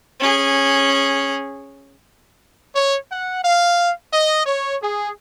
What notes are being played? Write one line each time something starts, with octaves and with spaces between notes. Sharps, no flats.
C#4 G#4
C#5
F#5
F5
D#5
C#5
G#4